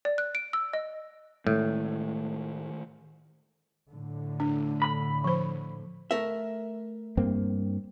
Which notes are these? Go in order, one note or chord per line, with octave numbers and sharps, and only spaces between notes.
D5
F#6
D7
E6
D#5
A2 D#3 G#3 A3
A2 D3
D4
B5
F3 C5
A3 A#4 E5
G2 A#3 C4